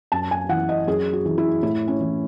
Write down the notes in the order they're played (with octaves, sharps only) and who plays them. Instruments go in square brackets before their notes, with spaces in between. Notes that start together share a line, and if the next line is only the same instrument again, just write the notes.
[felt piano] F#2 A5
G#5
E3 F#5
D#5
F#2 G#4
F#4
E3
E4
A2 E4
C#4
E3